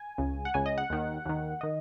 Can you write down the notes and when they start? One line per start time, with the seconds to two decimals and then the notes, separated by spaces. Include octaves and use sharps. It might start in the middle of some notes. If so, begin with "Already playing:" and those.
Already playing: G#5
0.18 C#2 C#3
0.45 F#5
0.54 C#2 C#3 G#5
0.66 D#5
0.78 F#5
0.90 D#2 D#3
1.26 D#2 D#3
1.61 D#3 D#5